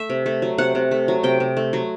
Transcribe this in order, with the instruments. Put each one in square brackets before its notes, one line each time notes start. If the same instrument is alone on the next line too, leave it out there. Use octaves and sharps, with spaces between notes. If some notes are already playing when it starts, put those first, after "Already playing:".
Already playing: [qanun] A3 E5
C3
A3
F#3
C3 F#5
C3
A3
F#3
C3 G5
C3
A3
F#3